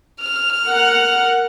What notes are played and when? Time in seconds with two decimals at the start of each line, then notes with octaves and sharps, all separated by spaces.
0.20 F6
0.66 A#4 F#5